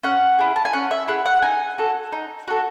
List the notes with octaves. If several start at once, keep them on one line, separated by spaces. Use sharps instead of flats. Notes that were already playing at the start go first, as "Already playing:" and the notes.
C#4 F#5
E4 G#4
A5
G#5
C#4 F#5
E5
E4 G#4 F#5
F#5
D#4 G#5
F#4 A4
D#4
F#4 A4